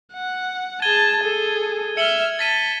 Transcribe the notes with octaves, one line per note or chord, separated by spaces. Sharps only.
F#5
G#4 A5 G#6 D#7 G7
G#4 A4
E5 F6 C#7 F#7 G7
A5 A6 B6 D#7